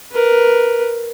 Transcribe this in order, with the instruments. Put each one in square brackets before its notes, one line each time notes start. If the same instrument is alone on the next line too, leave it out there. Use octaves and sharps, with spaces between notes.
[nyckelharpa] A#4 B4